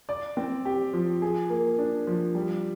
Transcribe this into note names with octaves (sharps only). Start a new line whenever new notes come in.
D5
C4
G4
F3
G#4
A#3
D4
F3
G3